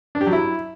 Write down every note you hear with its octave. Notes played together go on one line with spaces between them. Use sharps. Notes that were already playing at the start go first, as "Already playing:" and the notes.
D4
G4
F#3
E4